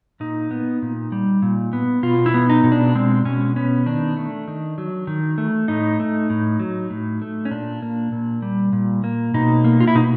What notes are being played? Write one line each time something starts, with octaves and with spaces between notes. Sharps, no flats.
A#2 D#4
B3
A#2
G3
A#2
B3
B2 F4
E4
B3
D#4
B2
D4
G#3 C4
B2 C#4
B3 C#4
D#3 D4
A3
D#3
F#3
D#3
A3
A2 D#4
A3
A2
F#3
A2
A3
C#4
A#2 D4
A#3
A#2
G3
A#2
A#3
B2 D#4
A#3
F4
E4
B2 D#4